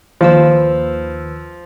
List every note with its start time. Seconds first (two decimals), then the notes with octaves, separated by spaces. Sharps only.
0.21 D#2 F3 B4 E6